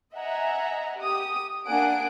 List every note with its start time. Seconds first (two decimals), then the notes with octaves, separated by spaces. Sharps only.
0.14 D#5 E5 F#5 G#5 A#5
0.97 G4 D#6
1.67 A#3 D4 F#5 G#5 D7